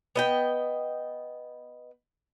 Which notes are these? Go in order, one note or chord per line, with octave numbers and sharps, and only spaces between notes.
B3 D#5 G5